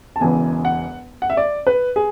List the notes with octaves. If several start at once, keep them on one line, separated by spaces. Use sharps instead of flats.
A5
E1 E2 C#3 E3 G#5
F#5
F#5
E5
D5
B4
G#4